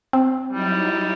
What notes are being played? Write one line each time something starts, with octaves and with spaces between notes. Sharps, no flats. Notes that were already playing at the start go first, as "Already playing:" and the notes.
C4
F#3 G3 D#4 E4